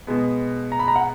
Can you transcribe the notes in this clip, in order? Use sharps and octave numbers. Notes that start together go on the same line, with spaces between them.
B2 G#3 B3
A#5
B5
A#5
F#5